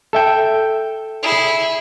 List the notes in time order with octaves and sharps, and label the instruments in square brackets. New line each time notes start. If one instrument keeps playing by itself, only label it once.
[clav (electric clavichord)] A4 E5 G5
[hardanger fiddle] E4 G#4